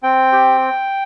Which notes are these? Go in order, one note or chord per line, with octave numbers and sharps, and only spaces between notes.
C4 G5
G4